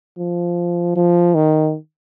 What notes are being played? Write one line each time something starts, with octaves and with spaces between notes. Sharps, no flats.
F3
F3
D#3